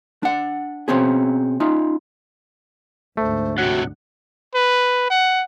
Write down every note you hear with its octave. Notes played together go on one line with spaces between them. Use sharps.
D4 F#5
B2 C4 C#4 G#4
C#4 D#4 F4
D2 G#2 A3 C5
A2 C3 F#4 F#5
B4
F#5